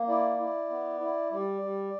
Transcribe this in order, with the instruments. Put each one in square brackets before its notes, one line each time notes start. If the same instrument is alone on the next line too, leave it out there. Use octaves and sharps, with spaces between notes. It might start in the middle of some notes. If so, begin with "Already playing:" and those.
Already playing: [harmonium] A#3
E4 D5
E4
B3
E4
G3 D5
G3